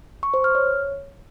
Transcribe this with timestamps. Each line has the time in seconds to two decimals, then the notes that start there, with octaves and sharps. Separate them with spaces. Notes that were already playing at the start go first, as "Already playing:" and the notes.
0.23 C#6
0.34 C5
0.44 F6
0.55 C#5